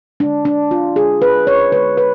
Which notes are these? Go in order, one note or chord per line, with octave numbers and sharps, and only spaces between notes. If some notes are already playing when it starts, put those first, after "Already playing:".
D3 G#3 D4
D4
F4
D3 G#3 G#4
B4
C#5
D3 G#3 B4
B4